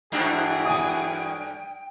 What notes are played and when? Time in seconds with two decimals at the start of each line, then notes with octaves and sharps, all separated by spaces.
0.12 G2 E3 F#3 A3 D4 G#4 G5
0.65 G#5 D#6